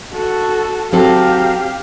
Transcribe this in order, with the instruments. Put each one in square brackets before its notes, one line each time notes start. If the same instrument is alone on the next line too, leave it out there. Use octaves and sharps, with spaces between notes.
[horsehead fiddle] F#4 A4
[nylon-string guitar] F#3 C4 A4 [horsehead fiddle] G4 F5